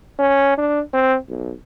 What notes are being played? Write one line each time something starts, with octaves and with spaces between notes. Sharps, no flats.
C#4
D4
C4
B1